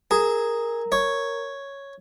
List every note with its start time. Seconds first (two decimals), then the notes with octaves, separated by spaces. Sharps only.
0.11 G#4 A#4 A#5
0.92 C#5